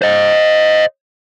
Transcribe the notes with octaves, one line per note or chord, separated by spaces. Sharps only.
C5 D#5